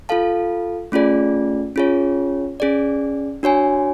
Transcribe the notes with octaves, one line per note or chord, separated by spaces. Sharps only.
F4 A4 F5 A5
A3 C#4 F4 G#4 D5
C#4 F4 G#4 C#5
C#4 G#4 D5
D4 F#4 C#5 G#5